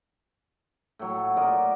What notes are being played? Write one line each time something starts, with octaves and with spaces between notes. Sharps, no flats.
A2 F#3
F4 A#4 D5 D#5